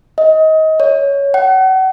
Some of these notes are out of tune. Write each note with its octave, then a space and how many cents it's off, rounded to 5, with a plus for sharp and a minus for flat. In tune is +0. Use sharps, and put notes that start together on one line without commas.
D#5 +25
C#5 +15
F#5 +35